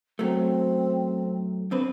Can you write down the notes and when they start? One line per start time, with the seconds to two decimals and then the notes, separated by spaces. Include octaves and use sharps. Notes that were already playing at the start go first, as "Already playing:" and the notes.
0.19 F#2 F#3 A3 C4
1.71 F2 C4 D4 B4